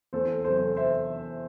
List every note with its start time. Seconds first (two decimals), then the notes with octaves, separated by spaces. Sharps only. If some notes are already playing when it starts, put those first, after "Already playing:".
0.13 E2 A4 C5
0.44 C3 F#3 B3 A4 C5
0.76 C5 E5